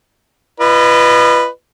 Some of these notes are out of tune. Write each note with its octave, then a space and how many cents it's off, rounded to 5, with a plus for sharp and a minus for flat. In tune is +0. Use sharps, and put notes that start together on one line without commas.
F4 -45 B4 +0 D#5 -35